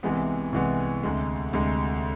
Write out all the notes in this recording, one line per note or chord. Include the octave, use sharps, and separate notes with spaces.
C2 C3 E3 G#3 B3
C2 C3 E3 G#3 B3
D2 C3 G#3
D2 C3 G#3